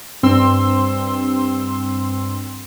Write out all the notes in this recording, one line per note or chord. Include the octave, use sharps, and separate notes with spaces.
G2 C4 C6 E6